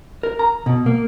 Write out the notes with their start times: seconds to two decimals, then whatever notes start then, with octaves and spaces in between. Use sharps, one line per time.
0.23 A#4
0.39 A#5
0.66 B2
0.86 A#3